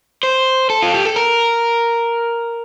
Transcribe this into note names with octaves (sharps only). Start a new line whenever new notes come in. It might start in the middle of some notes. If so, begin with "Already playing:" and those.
C5
A4
F4
G4
A4
A#4